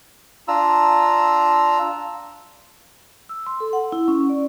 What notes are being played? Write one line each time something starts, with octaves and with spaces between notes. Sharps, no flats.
D4 F4 A#5 E6
E6
C6
A4
F#5
E4
C#4
D5